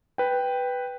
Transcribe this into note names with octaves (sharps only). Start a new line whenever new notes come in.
B4 G5